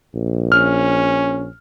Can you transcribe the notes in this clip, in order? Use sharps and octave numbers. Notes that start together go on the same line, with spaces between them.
A#1
C#4 F6